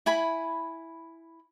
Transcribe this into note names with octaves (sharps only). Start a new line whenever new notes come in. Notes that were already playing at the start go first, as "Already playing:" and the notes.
E4 G#5 B5